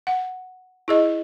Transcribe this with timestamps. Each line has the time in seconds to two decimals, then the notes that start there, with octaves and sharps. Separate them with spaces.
0.07 F#5
0.88 E4 G#4 D#5